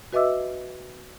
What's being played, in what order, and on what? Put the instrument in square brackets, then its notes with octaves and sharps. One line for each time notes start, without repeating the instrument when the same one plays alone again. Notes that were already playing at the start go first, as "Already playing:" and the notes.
[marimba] F#4 B4 D#5 E5 D6 E6